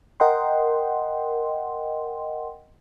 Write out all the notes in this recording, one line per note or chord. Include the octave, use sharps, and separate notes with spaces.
A#4 D#5 F#5 G5 C6